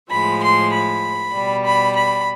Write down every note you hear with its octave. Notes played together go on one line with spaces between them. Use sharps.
A2 F3 G#3 B5
C6
B5
B2 G3
B5
B5